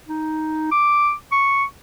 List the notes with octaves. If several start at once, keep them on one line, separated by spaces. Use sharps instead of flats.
D#4
D6
C#6